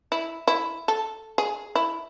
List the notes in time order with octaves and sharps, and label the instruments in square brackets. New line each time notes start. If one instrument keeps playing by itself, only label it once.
[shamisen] E4
E4
A4
G#4
E4